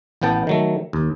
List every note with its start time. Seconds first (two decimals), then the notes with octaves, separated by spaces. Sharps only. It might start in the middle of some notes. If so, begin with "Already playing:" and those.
0.22 A1 A2 B3 G5 A5
0.47 D#3 F#3 A3
0.93 D#2